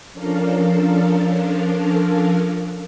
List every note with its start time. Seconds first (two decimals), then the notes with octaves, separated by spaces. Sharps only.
0.12 F3 C#4 D4 A4 A#4 F5